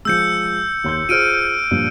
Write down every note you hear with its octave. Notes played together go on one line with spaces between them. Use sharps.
F3 G#3 E6 G6 C#7
D#2 C6 G6
F4 G#4 C5 F6 D7 D#7
G2 A#2 F3